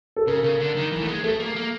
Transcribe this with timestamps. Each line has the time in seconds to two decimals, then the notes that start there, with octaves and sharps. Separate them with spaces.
0.16 A4
0.27 C#3 A#4
0.43 C#3
0.59 D3
0.76 D#3
0.92 E3
1.02 A3
1.08 G#3
1.24 A3 A4
1.40 A#3
1.56 A#3